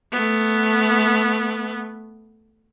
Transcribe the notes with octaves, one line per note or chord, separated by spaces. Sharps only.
A3 B3